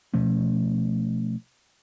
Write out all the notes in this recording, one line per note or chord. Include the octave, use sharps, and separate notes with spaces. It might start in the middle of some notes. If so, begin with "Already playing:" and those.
B2 F3 A3 C#4